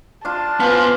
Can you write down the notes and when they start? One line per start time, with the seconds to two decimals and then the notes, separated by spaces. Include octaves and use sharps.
0.25 D4 F4 A5
0.60 B3 F4 B4 C5 F5 G#5